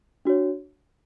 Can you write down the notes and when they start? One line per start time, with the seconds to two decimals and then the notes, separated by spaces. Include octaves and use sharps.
0.25 D4 F#4 C#5